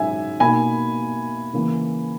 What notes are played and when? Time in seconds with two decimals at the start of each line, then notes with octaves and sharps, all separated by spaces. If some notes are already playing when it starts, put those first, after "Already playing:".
Already playing: G#2 F#3 C#4 E5 G#5
0.40 B2 A#3 D#4 G#5 B5
1.53 C#3 E3 A#3